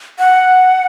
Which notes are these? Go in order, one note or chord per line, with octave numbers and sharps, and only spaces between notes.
F#5